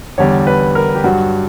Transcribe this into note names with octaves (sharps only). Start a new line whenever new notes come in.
E2 D3 G3 C#5
B4
A#4
G4
G2 F#3 F#4